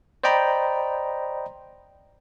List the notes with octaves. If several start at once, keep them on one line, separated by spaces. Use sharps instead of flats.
C5 D5 D#5 G5 A#5 B5